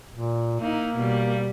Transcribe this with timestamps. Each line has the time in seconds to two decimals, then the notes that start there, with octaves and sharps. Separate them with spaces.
0.12 A#2
0.60 A#3 D#4 E4
0.96 B2 G3